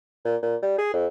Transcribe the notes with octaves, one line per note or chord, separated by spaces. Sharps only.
A#2
A#2
G3
G#4
F2